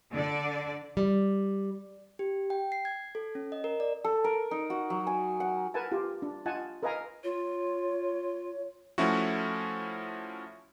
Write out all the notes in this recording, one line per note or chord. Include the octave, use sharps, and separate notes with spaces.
D3 D5
G3
G4
G5
C7
G#6
A4
C#4
D#5
A#4
D5
A4
A#4
D#4
F#4
F#3
G#5
F#5
A#4 B4 F#5 G#5 A5
F4 G4
D4
F4 D#5 F#5 G#5 A5
A#4 B4 D#5 F5 G#5 A#5
F4 C#5
F3 A3 C#4 E4 F#4